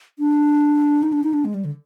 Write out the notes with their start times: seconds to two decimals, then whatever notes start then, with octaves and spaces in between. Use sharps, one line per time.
0.19 D4
1.03 D#4
1.12 D4
1.24 D#4
1.33 D4
1.45 G#3
1.54 G3
1.65 D3